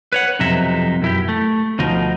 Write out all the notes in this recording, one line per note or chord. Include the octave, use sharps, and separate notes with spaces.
B4 C#5 F#5
B1 F2 C3 D#4 E5
F#2 E4 G4
A3
D2 B2 F3 D#4